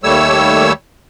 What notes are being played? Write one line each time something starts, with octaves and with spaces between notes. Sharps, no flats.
D#2 G3 A3 C#5 E6